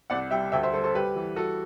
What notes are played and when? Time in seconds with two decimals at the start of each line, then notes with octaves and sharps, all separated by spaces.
0.10 C2 D5 F#5
0.31 G3 E5 G5
0.52 D2 E5 G5
0.63 C5 E5
0.73 G3 A4 C5
0.84 A4 C5
0.95 G3 G4 B4
1.16 E3
1.36 G3 F#4 A4